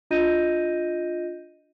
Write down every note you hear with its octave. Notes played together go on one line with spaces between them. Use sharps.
D4 F4 D#5 G6 A#6 D#7